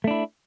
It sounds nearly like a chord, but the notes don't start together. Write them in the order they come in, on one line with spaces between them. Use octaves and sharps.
A3 D4 E4